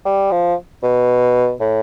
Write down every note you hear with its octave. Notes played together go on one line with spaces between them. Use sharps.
G3
F3
B2
A2